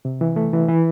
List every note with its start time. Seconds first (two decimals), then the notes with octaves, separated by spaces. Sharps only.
0.05 C3
0.21 E3
0.36 A3
0.53 E3
0.68 E3